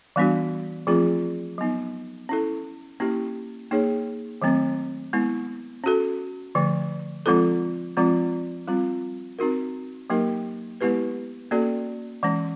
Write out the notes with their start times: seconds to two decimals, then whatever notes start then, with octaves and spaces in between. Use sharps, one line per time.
0.16 E3 G3 B3 D4 F#4
0.87 F3 A3 C4 F4 G#4
1.58 F#3 B3 D#4
2.29 C#4 E4 A4
3.00 A#3 C#4 E4 G4
3.71 A#3 D#4 G#4 C#5
4.42 D#3 F#3 A3 C4
5.13 G#3 B3 E4
5.84 C#4 F#4 A4
6.55 D3 F3 A3
7.26 F3 G#3 C4 F4 A4
7.97 F3 G#3 C4 F4
8.68 G3 C4 F4
9.39 C4 D#4 F#4 A#4
10.10 F#3 A#3 D#4 G4 A#4
10.81 G#3 B3 E4 G4 B4
11.51 A#3 C#4 F#4 A4 D5
12.23 E3 G#3 C#4